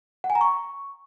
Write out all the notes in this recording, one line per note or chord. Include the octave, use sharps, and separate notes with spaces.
F#5
G#5
A#5
C#6